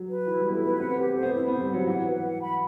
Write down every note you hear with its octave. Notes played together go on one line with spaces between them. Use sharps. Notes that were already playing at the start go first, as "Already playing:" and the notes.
Already playing: F#3
B4
E3 E4
G3
B3 E4
A3
B3 B4
C4 F#5
G4
B3
A3 C5
B3
E4
C4
B3 C5
G3
F#3 F#5
E3 F#5
B4
F#5
B5